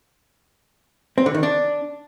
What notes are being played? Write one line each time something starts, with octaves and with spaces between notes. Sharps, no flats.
C4
D3
D#3
D4